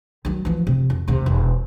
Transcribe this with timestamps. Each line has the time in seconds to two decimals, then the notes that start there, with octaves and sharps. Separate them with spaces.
0.25 D#3 F#3
0.45 E3 F3
0.67 C3
0.90 F2
1.08 D#2 C3
1.26 E1